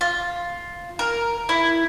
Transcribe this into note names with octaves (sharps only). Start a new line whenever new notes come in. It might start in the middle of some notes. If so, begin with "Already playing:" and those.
F4
A#4
E4